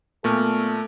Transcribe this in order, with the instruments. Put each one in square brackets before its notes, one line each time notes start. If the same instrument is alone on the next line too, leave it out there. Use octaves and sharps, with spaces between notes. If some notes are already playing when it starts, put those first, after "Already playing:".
[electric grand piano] A#2 A3 [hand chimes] B3 C#6 F6 [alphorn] A4